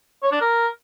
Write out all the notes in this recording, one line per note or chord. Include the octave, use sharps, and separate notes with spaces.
C#5
D4
A#4